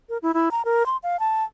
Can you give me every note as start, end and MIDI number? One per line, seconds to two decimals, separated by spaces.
0.09 0.18 70
0.22 0.32 64
0.34 0.49 64
0.51 0.62 82
0.65 0.86 70
0.86 0.97 84
1.03 1.19 77
1.20 1.44 81